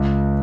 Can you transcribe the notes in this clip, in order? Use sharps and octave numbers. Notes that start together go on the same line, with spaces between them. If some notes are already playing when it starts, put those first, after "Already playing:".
Already playing: C#2